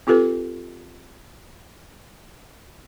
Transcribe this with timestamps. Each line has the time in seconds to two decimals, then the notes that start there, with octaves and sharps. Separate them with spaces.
0.07 C4 F4 G4 A4 B4